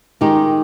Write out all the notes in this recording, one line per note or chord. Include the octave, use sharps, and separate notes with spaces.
D#3 G#3 D#4 G4